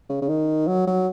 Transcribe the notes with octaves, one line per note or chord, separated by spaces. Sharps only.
C#3
C#3
D#3
F#3
F#3